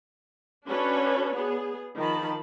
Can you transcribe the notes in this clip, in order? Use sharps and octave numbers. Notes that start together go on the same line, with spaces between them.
C#4 D4 F#4 A4 B4 C#5
B3 G#4
D#3 F3 A5 B5